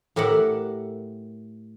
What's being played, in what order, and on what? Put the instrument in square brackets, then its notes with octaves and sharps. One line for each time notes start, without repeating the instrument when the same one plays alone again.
[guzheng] A2 G4 A#4 E5 F#5